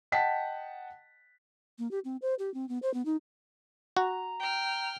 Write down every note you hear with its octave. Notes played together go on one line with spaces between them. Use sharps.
D#5 F#5 G5 A5 B6
A#3
G4
C4
C5
G4
C4
B3
C5
B3
D#4
F#4 A#5
G5 F6